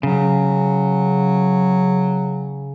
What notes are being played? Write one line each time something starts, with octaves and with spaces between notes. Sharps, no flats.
C#3 F#3